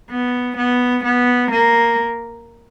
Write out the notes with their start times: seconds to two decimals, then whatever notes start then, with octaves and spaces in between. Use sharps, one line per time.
0.10 B3
0.57 B3
1.04 B3
1.51 A#3